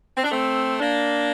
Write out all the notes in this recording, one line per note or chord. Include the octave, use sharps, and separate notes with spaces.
C4
D4
A3 C4
A#3 D4